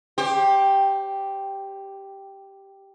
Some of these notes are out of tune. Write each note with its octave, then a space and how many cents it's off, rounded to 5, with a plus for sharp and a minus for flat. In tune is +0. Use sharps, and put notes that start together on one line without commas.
G4 +0 C5 +25